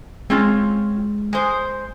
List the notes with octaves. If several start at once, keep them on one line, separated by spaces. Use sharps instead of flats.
G#3 C4 C#4 F4
G#3 C5